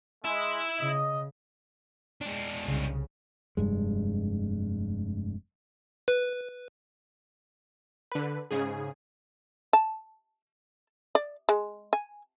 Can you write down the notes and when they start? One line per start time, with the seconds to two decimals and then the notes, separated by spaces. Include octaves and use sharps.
0.24 G#3 E4 E5
0.80 C#3 D#5
2.21 G#3 D4
2.64 C2 C#3
3.57 F1 G2 G#3
6.08 B4
8.12 D3 B4
8.51 G#2 C#3 G#4
9.73 A5
11.15 D5
11.49 G#3
11.93 G#5